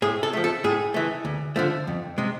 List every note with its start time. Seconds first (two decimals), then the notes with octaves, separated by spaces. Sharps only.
0.02 A2 G#4
0.23 A4
0.33 F3 A3
0.44 A4
0.64 A2 G#4
0.94 E3 A3
1.25 D2
1.56 D3 F3 A3
1.87 F2
2.18 C3 G#3